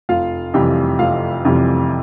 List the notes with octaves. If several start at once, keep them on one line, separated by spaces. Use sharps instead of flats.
F1 F4 F5
F2 C3 E3 G3 G4 G5
F1 F4 F5
F2 C3 E3 G3